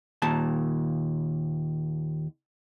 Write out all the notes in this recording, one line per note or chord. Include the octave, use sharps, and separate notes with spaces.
D#2 A#2 A5